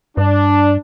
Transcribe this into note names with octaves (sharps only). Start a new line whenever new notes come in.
G2 D4